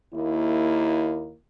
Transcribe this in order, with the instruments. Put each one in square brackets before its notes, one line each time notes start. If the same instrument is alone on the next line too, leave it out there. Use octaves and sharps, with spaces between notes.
[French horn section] D#2 A#3 E4